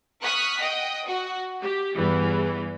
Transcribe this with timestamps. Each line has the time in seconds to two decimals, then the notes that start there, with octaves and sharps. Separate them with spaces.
0.22 C#6 D#6 F6 F#6 B6
0.58 D#5 F#5 G5 D#6
1.06 F#4 F#5
1.60 G4
1.95 E2 G2 E3